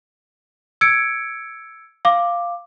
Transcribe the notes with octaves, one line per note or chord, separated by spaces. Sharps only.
E6 G#6 C#7 D7
F5 D6